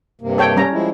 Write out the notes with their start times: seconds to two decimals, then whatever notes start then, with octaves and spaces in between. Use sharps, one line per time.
0.21 G2 C3 A#3
0.38 A4 C#5 G5
0.57 G3 C#4 A#5
0.72 F3 G#3 E4